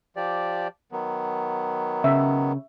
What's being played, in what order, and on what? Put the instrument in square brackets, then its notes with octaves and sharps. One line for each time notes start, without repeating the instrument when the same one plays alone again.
[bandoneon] F3 G4 D5
D#3 F#3 B3
[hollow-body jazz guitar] C#3 [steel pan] E5